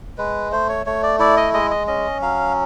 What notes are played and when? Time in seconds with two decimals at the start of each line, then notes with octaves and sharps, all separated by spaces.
0.18 G#3 B4
0.52 A3 C5
0.69 C#5
0.86 A3 C#5
1.03 D5
1.19 E4 D5
1.37 D#5
1.54 G#3 D#5
1.71 D#5
1.87 C#4 D#5
2.22 F#3 F5